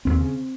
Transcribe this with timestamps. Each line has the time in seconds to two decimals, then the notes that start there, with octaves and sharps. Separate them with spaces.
0.05 D#2 C4
0.21 C#3